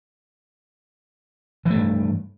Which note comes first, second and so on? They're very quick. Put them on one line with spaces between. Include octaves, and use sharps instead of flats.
E3 A3 G2